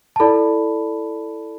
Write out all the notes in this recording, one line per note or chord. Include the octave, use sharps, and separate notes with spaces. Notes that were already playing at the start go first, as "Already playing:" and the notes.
A5
E4 A4 D5 B5